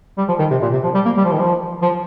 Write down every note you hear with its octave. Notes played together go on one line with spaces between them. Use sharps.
G3
F3
D#3
C3
A#2
C3
F3
G3
A#3
G3
F3
D#3
F3
F3